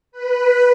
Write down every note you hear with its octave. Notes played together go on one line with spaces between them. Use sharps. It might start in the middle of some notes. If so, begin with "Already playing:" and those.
B4